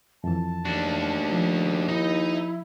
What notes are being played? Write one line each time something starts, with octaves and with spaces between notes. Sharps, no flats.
F2 E3 A5
D#2 D4 F#4
F3
D#4 E4 D#5